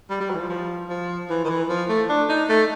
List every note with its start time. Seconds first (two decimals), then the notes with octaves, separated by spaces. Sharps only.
0.10 G3
0.20 G3
0.30 F#3
0.35 E3
0.39 F3
0.50 F3
0.89 F3
1.29 E3
1.44 D#3
1.49 E3
1.69 F3
1.88 A3
2.09 D4
2.29 D#4
2.49 A3